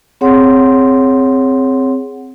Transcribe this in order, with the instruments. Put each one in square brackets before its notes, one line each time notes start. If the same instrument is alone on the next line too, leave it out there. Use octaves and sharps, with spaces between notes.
[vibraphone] C4 G#4 C#5 F#5 C6